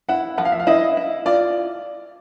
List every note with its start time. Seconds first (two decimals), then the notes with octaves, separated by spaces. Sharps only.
0.09 E4 F#5
0.38 F3 F#5
0.45 F5
0.52 E5
0.60 F5
0.67 E4 D#5
0.97 E4
1.26 F4 D5